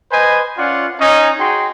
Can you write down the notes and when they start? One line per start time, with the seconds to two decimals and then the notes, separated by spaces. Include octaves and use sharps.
0.11 B4 C5 D#5 G#5
0.57 C#4 F4 D5 F#5
1.00 C#4 D#4
1.39 F#4 G#4 G5 C6